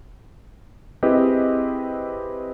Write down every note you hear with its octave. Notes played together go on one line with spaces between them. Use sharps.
C4 E4 G4 G#4 B4 D#5